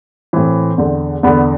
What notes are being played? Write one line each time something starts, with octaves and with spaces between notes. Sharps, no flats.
A2 E3 C4
E2 D3
E2 D3 B3